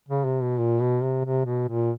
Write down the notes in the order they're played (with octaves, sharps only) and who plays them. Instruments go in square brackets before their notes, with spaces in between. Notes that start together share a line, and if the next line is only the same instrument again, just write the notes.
[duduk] C#3
C3
B2
A#2
B2
C3
C3
B2
A#2